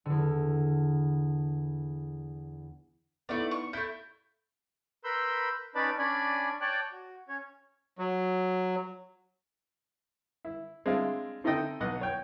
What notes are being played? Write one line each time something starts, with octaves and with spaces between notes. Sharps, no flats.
E2 D3
A3 B3 D#4 E4 D5
C#6
A3 E4 G6
A#4 B4 B5 C6 E6 G6
C#4 D#4 B4 D5 A5 B5
C#4 D4 D5 G#5 B5
C#5 D5 G5 A5 D6 F#6
F#4
C#4 C#5
F#3
E4
G#3 C4 D4 E4 F4
C4 D#4 E4 A4 D#5 G5
B1 D#5 F#5
C#5 G5